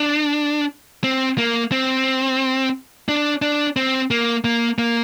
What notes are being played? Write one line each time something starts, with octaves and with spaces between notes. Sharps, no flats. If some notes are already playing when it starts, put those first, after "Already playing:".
Already playing: D4
C4
A#3
C4
D4
D4
C4
A#3
A#3
A#3